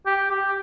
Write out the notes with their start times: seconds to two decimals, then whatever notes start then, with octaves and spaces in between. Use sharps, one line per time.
0.06 G4
0.31 G4